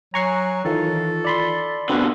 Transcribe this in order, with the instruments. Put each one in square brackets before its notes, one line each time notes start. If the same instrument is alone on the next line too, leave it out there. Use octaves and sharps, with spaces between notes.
[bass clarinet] F#3 [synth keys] G#5 F#6 [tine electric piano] A#5 C#6 C7
[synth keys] D#3 E3 F4 [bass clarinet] A4
[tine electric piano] D5 B5 C6
[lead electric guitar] B2 D3 [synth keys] C4 F#4 B4